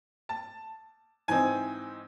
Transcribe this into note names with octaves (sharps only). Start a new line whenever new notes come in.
A5
G#2 E3 C4 D#4 G#5